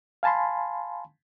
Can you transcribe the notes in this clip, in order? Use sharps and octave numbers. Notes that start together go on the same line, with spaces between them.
F5 G#5 A5 B5 C6